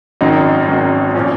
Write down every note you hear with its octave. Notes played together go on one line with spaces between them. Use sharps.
G#1 F#2 D#3 D#4
G#1 F#2 D#3
A#2 F3 C#4